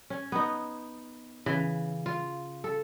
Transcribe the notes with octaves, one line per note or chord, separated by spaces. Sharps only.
C#4
B3 D#4
C#3 E3
F4
A4